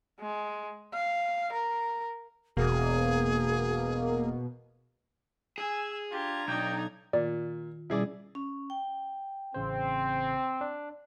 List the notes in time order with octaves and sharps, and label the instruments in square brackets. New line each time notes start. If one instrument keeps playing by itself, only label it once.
[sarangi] G#3
F5
A#4
[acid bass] E1 [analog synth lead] B2 [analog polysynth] A#3 [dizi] G#4
[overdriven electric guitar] G#4 [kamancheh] G#5 E6
[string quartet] D4 A#5 G#6 [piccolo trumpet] F4 [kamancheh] G4
[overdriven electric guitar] B1 [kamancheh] D#4 D5 [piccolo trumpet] G5
[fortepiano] A#2 [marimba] D#3 F4 [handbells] D5
[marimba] B2 G3 C#4 [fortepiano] E4 G#4 D5
[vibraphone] C#4
G5
[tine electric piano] A1 C#3 C5 [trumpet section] C4
[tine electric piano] D4